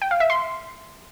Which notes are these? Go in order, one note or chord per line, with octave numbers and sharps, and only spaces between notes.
G5
F5
E5
C6